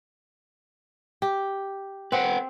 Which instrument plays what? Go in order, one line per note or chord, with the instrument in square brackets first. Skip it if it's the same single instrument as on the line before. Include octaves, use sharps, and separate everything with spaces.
[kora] G4
[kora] C4 [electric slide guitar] B4 F#5 G5